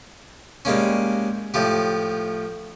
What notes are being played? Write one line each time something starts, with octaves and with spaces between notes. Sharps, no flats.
G3 G#3 A#3 C#4
A2 F3 G4